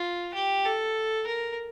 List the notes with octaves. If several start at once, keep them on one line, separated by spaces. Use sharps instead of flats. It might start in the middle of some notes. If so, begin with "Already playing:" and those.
Already playing: F4
G4
A4
A#4